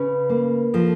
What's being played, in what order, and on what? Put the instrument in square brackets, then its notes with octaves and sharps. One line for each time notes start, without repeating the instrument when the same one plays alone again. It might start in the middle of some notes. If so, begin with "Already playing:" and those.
Already playing: [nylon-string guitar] C#3 [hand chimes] B4
[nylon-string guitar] A#3
[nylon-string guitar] F3 [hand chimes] A4